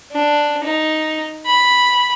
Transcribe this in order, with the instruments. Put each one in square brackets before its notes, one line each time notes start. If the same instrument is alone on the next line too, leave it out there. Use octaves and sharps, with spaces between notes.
[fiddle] D4
D#4
B5